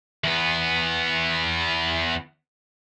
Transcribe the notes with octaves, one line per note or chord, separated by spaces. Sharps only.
E2 B3